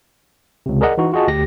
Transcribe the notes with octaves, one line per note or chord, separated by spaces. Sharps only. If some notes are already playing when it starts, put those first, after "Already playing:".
C#2 C3
G#4 A#4 D5 D#5 F#5
E3 D#4 F#4
F4 F#4 G#4 D#5 A5
D2 G4 A#6